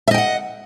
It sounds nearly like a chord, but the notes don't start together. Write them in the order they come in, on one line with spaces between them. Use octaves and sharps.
E5 D#5 G5 F#5